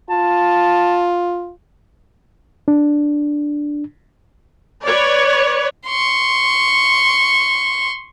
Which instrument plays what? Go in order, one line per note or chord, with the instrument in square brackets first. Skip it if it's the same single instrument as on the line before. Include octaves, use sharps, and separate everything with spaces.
[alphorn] F4 [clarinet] A5
[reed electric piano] D4
[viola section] B4 C#5 D5
[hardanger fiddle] C6 C#6